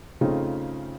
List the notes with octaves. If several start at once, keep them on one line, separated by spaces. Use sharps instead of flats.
C#3 A3 C4 D#4 F4 G#4